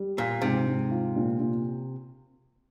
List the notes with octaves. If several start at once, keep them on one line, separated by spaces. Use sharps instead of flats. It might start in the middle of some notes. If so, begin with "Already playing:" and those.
Already playing: G3
A#2 F4
G#2 C3
G#2
F4
A#2
A#2